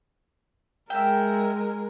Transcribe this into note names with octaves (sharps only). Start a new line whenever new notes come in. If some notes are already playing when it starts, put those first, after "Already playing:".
G#3 A#4 E5 G5